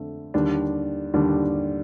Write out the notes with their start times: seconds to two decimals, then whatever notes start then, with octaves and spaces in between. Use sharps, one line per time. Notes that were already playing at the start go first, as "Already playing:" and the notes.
Already playing: F2 D3 A3
0.34 D#2 D3 G3 D4
1.14 D#2 D3 G3 D4